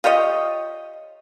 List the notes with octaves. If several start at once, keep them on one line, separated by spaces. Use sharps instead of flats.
F4 G4 C#5 D#5